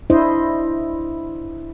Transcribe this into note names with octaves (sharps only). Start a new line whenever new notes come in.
D4 E4 C5 D#5